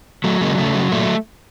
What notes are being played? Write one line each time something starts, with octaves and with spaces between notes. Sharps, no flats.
F#3 A3
C#3 G#3 A#3
C#3 A3
F#3
A#2 A3